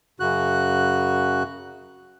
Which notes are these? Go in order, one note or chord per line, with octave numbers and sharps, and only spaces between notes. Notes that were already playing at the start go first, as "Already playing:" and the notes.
F#2 C#3 F#4 F#6